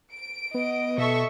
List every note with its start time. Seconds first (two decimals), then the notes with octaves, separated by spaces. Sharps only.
0.11 D7
0.54 B3 D#5
0.98 B2 A4 E5 C#6